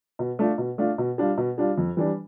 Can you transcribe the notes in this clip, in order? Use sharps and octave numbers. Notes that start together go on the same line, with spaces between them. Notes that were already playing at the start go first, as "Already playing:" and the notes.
B2
A3 D4 F4
B2
A3 D4 F4
B2
G3 D4 F4
B2
G3 D4 F4
F2
E3 G3 D4